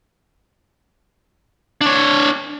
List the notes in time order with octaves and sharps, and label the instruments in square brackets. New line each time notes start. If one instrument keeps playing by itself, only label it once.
[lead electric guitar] D4 C#5